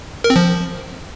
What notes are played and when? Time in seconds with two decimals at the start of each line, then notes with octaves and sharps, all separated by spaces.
0.24 A#4
0.30 C4
0.36 F3